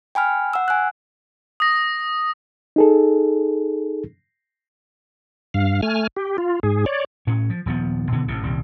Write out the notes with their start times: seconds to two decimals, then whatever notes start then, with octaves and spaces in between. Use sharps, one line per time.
0.15 G5 G#5 B5 F6
0.53 F#5 E6
0.68 G#5 F#6
1.60 D#6 A#6
2.76 D#4 G#4 A4
5.54 G2 F5
5.83 A3 G#5 F6
6.17 G4
6.38 F4
6.63 G#2 G#4
6.86 C#5 D5
7.27 A2 C#4
7.50 F3
7.66 D#1 F3 B3
8.12 B2 D3 E3 B3
8.28 A1 A2 C3
8.42 D#1 C2 G3